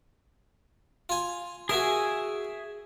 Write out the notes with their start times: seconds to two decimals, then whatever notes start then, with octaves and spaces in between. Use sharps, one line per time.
1.09 F4 G#5
1.69 F#4 G#4 A#4 E5 G#5